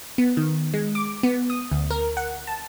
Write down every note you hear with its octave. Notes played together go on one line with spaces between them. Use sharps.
B3
D#3
G#3
D6
B3
D#6
D2
A#4
F#5
A5